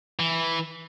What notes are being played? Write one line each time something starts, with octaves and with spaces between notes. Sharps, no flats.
E3